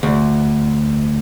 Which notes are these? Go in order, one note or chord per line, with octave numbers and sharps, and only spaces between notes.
D2